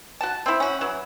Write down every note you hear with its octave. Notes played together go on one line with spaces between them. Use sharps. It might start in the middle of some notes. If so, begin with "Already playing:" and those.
F#4 A5
C4 E4
C#4 F#4
E3 F#3